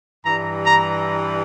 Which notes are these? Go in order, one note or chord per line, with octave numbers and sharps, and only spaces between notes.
G2 E3 G3 A#5
A#5